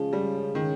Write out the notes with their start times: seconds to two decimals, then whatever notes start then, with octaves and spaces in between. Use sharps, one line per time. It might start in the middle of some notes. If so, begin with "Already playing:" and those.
Already playing: C#3 F3 G#3 C#4 G#4
0.13 G3
0.55 D#3